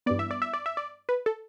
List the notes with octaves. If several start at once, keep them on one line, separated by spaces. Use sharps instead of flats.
G2 E3 B3 D5
E5
D5
E5
D5
E5
D5
B4
A4